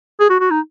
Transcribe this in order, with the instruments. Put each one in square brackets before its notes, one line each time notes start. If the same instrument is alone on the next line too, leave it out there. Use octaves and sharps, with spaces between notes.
[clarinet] G#4
F#4
F#4
D#4